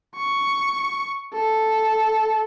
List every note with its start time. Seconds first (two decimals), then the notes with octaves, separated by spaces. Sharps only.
0.16 C#6
1.34 A4